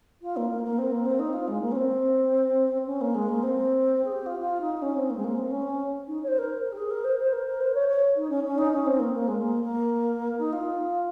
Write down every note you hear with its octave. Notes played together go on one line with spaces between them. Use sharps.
F4
A#3
A#3
A#3
C4
A#3
C4
D#4
F4
G#3
A#3
C#4
C4
C#4
A#3
G#3
A#3
C4
G#4
G4
F4
F4
D#4
C#4
C4
A#3
G#3
A#3
C4
C#4
D#4
C#5
C5
A#4
A#4
G4
G#4
A#4
C5
C5
A#4
A#4
C5
C#5
C#5
D#4
C#4
C#4
D#4
C#4
C4
A#3
A#3
G#3
A#3
A#3
D#4
F4